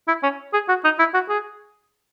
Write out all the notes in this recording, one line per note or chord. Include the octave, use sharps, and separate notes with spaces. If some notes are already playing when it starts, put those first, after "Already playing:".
E4
C#4
G#4
F#4
D#4
E4
F#4
G#4